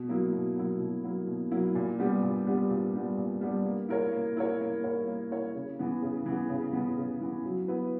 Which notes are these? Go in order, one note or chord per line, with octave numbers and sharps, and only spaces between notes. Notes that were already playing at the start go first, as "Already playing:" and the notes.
Already playing: B2
F#3 A#3 E4
B2
F#3 A#3 E4
B2
F#3 A#3 E4
B2
F#3 A#3 E4
A#2
G3 B3 D4 G4
A#2
G3 B3 D4 G4
A#2
G3 B3 D4 G4
A#2
G3 B3 D4 G4
A#3
E4 A#4 C#5
A#3
E4 A#4 C#5
A#3
E4 A#4 C#5
A#3
E4 A#4 C#5
C#3
E3 B3
C#3
E3 B3
C#3
E3 B3
C#3
E3 B3
F#3
B3 E4 B4